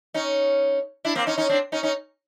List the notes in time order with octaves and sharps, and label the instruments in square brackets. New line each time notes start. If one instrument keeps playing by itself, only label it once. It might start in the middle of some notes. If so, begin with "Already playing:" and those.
[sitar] C#4 D#4
D4 E4
A#3 C4
C#4 D#4
C#4 D#4
C4 D4
C#4 D#4
C#4 D#4